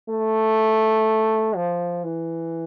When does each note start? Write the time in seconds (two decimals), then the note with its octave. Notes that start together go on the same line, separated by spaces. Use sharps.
0.09 A3
1.56 F3
2.04 E3